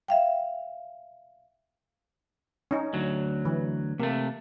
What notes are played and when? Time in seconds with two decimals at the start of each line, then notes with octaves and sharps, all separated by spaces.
0.08 E5 F5 G5
2.71 C#4 D#4
2.93 D2 F#3
3.45 E3
4.00 C3 A3 A#3